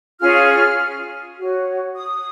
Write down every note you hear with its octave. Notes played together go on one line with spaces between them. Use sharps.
C#4 F4 G#4 F6
F#4 C#5
D#6